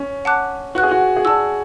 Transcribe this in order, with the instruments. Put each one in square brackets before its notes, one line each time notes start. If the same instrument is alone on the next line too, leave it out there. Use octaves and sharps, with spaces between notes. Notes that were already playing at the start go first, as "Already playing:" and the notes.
Already playing: [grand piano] C#4
[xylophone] F#5 A5 D6 F#6
[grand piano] F#4 [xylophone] B4 F#5 C#6 F#6
[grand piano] G#4
F#4
G#4
[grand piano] F#4 [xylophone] D5 A5 E6